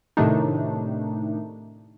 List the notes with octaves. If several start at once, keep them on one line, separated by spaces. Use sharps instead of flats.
A2 C3 D#3 A3 D4 D#4